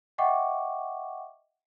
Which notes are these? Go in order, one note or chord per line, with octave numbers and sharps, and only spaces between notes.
D#5 E5 F#5 G5 C#6 D6